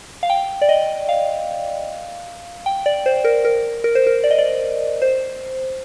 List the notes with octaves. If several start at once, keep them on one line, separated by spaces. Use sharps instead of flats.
F5
G5
D5
D#5
F5
G5
D5
C5
A#4
A#4
A#4
C5
A#4
D5
D#5
D5
C5